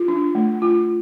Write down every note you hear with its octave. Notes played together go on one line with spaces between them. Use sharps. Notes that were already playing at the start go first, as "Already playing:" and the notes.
Already playing: F4
D4
A3
F4